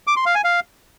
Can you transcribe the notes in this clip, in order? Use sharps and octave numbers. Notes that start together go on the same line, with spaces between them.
D6
C6
F5
G#5
F5